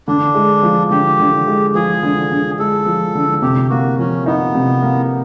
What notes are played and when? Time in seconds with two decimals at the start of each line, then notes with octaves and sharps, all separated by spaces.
0.08 D3 D4
0.35 G#3
0.63 F3
0.91 D3 G4
1.20 D3
1.47 G#3
1.75 F3 G#4
2.03 D3
2.31 D3
2.59 G#3 A4
2.86 F3
3.15 D3
3.42 C3 G4
3.70 A#3 F#4
3.98 F3 C#4
4.26 B3 D#4
4.55 C3
4.82 A#3